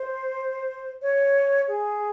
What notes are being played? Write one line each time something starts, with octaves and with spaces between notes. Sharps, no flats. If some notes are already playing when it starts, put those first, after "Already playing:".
Already playing: C5
C#5
G#4